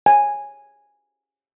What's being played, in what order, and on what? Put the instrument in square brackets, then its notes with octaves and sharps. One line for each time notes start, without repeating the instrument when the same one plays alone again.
[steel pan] G#5